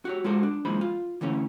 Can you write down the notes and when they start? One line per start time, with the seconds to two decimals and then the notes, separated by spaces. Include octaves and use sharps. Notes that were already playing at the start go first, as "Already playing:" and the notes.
0.05 F#4 G4 C#5
0.24 G#3 F4 F#4 A4 C5
0.43 D4
0.65 F#2 A#2 E3 G#3 C5 B5
0.81 F4
1.21 D3 E3 A3 C#4